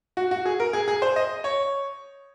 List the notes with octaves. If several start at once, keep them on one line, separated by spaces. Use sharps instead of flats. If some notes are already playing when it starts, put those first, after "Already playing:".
F#4
F#4
G#4
A#4
G#4
G#4
C5
D#5
C#5